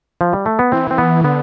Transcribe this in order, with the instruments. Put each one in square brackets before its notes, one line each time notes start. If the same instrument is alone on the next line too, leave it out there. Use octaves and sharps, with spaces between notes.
[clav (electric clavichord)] F3
G3
A3
B3
[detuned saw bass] E3 [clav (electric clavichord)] C4
[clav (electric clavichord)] C4
B3
[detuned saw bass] D3 [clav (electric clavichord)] B3